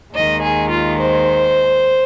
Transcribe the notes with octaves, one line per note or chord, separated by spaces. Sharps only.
D#2 D#3 G#3 D#5
G#4
F4
C5